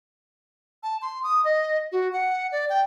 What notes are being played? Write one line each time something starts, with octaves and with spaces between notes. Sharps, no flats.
A5
C6
D#6
D#5
F#4
F#5
D5
G5